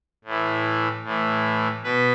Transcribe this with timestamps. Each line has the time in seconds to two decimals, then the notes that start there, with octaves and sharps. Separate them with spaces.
0.25 A2 E3
1.04 A2 E3
1.84 B2 B4